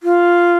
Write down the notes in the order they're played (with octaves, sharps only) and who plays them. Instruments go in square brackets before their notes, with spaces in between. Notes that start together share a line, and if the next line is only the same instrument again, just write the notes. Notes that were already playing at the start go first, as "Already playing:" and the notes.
[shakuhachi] F4